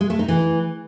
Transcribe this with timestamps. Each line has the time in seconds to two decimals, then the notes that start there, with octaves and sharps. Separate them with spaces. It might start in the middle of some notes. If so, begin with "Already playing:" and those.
0.01 G#3
0.10 A3
0.19 D#4
0.28 E3